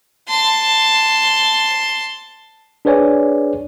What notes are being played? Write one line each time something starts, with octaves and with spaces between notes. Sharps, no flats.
A5 C6
D4 G#4 B4 C#5 D5 G#5